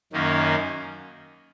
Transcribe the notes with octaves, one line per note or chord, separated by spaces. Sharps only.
F#2 D#3 A#3 C#4